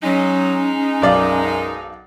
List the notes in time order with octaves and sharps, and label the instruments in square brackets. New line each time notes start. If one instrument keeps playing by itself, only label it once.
[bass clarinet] F#3 [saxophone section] G#3 D#4 [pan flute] C#4
[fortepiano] B1 D5 F5 [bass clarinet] F#2